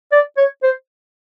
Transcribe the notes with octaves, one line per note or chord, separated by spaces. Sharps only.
D5
C#5
C5